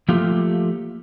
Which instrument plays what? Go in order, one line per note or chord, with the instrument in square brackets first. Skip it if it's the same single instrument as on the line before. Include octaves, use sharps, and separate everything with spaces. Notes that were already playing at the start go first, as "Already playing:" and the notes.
[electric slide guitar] F3 A3 A#3 F4 G4